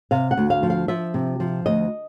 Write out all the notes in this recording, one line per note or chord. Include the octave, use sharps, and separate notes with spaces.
C3 F5
F#5
D2
F5
F3
F5
F3 E5
C3
F3
D2 D#5